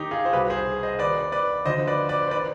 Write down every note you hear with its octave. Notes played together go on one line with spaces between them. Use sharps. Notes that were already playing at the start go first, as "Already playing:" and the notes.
Already playing: D#2 D#3 D#4 G4
F4 G#4
C5
C2 B2 G4 B4
G#4 C5
C5 D#5
D#2 D#3 B4 D5
B4 D5
D2 D3 F3 C5 D#5
B4 D5
B4 D5
C5
D#3 B4 D5